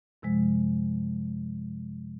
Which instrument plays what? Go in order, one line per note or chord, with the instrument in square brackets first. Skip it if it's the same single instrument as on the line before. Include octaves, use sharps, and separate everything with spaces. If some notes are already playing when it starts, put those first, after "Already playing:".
[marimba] F#2 C3 F3 G#3